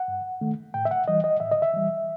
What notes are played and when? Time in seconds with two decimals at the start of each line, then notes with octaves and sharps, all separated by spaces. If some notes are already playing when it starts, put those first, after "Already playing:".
Already playing: F#5
0.08 G2
0.41 D#3 A3
0.74 A2 G5
0.85 E5
0.91 F#5
1.08 E3 G3 D#5
1.24 D#5
1.40 A2 E5
1.51 D#5
1.62 E5
1.73 E3 G3